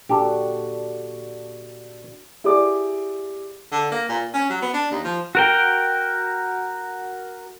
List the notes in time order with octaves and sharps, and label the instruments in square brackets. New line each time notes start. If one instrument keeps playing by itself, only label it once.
[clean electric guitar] A#2 [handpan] D4 F#4 [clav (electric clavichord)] G4 A4
[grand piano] E4 G4 G#4 D5 D6
[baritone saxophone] D3
A#3
A#2
C#4
F#3
B3
D4
D#2
F3
[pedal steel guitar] F#4 A#4 G5